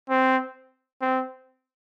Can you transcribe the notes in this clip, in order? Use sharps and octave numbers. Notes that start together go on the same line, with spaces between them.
C4
C4